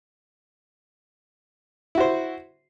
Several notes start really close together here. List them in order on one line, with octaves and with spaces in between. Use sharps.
E4 F#4 C5